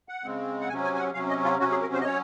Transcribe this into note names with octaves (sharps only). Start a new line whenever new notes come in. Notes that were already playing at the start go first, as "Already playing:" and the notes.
F#5
C#3 G#3 C4
F#5
C3 F#3 C#4 G#5
G#5
G#5
F#5
C3 F#3 C#4 F5
D#5
F4
C3 F#3 C#4 F#4
G#4
A#4
C5
D#5
F#3 C#4 C#5